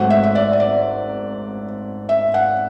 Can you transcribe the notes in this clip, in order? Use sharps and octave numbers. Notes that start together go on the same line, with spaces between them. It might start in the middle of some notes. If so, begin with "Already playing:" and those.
Already playing: G#1 G#2 F#3 A3 F#5
E5
E5
D5
E5
D5
E5
F#5